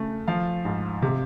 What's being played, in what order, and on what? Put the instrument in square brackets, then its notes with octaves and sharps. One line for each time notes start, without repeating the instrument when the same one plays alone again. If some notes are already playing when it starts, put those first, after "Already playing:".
Already playing: [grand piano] C#3 A3
F3 F5
G#2
C3